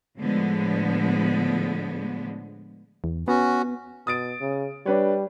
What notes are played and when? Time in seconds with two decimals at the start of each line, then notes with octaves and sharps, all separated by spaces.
0.17 A2 D3 F3 G#3 B3
3.04 E2
3.28 B3 C#4 F#4
4.07 B2 D#6 A6 D7
4.41 C#3
4.86 G3 D4 B4 C#5